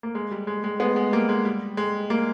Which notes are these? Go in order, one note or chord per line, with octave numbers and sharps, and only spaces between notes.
A#3
G#3
G3
G#3
G#3
G#3 B3
G#3
G3 A#3
G#3
G3
G#3
G3 A#3